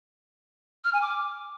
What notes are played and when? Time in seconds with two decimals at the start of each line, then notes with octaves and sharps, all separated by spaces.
0.84 F6
0.93 G#5
1.02 D6